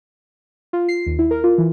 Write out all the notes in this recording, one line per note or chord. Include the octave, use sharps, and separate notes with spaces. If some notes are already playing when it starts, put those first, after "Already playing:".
F4
C7
D#2
E4
A#4
F4
E3